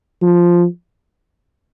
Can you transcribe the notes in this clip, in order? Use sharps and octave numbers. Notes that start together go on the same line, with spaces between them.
F3